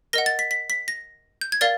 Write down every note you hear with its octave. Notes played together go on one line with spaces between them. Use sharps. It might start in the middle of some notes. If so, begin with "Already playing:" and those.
A#4 D#5 F#5 A#6
A6
B6
B6
B6
A#6
G6
G#6
A#4 D5 F5 A6